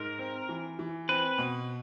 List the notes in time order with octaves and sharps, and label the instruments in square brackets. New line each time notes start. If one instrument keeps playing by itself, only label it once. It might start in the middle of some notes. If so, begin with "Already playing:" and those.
Already playing: [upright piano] G#2 [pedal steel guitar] A#4
[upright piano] C4
E3
E3
[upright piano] C4 [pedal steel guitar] B4
[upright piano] B2